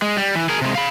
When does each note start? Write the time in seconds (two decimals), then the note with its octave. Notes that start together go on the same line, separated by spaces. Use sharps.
0.02 G#3
0.17 G3
0.35 E3
0.49 G#4 A#4
0.62 C3 G#3
0.75 F5 B5